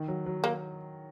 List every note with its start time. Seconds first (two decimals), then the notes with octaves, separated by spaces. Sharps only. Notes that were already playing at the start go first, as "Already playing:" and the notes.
Already playing: D#3
0.08 F#3
0.26 F#3
0.44 A#3